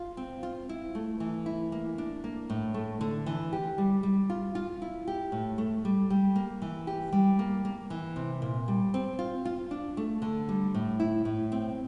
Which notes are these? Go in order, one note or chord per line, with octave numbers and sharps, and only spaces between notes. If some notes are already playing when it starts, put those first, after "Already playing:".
Already playing: F4
C4
F4
E4
A3
E3
E4
A#3
D4
A#3
A2
A3
D3
E3
G4
G3
G3
F4
F4
E4
G4
A2
A3
G3
G3
A#3
E3
G4
G3
A#3
A#3
E3
C3
A#2
G3
C4
F4
F4
D4
A3
D3
G3
A2
E4
A2
C4